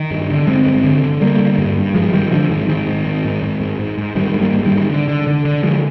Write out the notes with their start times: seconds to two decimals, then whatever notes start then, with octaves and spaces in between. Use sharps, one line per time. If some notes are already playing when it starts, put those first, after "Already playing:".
Already playing: D#3
0.11 G2
0.30 D3
0.47 D3 G#3 C4
0.67 G2
0.84 D3
1.04 D3
1.21 D3 G3 A#3
1.39 D3
1.58 G2
1.77 G2
1.94 G#2 F3 G#3
2.13 G#2 D#3 G3
2.32 G#2 D3 F3
2.50 G#2 D#3
2.69 G#2 D#3
2.87 G#2
3.06 G#2
3.25 G#2
3.43 G#2
3.61 G#2
3.79 G#2
3.98 G#2
4.16 G#2 D#3 G3
4.35 G#2
4.41 G3 A#3
4.53 G#2
4.65 D#3 G3
4.72 G#2
4.89 D3
5.08 D3
5.27 D3
5.45 D3
5.63 D3 F3 G#3